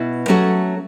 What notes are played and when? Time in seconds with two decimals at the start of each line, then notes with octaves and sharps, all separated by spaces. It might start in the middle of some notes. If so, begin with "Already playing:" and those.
Already playing: B2 E4
0.28 F#3 A3 C#4 F#4 A4